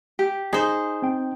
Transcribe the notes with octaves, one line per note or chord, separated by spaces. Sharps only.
G4
D#4 G#4 C5
C4 G5